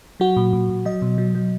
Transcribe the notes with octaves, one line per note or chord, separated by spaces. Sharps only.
F#3 F#4
A#2
A#2
A#2
F#3 D#5
B2
F#3
F#3